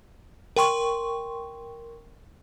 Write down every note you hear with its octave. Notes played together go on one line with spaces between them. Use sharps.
A#4 G5 C6 C#6